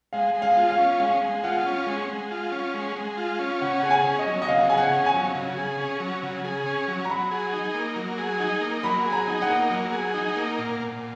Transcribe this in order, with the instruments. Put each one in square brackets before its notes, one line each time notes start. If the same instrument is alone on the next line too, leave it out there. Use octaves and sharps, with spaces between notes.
[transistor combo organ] G#3 [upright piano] F5
[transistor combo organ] G#3
[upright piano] F5
[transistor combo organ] F4
[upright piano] F5
[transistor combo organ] C#4
[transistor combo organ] G#3 [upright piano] F5
[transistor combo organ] G#3
[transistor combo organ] F4 [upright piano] F#5
[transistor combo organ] C#4
G#3
G#3
F4
C#4
G#3
G#3
F4
C#4
[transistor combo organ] C#3 [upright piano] F#5
[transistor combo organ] G#4 [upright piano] F#5
[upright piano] G#5
[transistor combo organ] C#4
[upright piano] D#5
[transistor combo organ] F#3
[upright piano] D#5
[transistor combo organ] C#3 [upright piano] F5
[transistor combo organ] G#4 [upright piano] G#5
[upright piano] F#5
[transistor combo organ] C#4
[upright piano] G#5
[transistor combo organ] F#3
C#3
G#4
C#4
F#3
C#3
G#4
C#4
F#3
[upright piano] A#5
[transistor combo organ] F#3 [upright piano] B5
[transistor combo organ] G#4
D#4
A#3
F#3
G#4
D#4
A#3
[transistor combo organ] F#3 [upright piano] B5
[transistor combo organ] G#4
[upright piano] A#5
[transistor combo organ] D#4
[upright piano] F#5
[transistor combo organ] A#3
F#3
G#4
D#4
A#3
A#2
A#2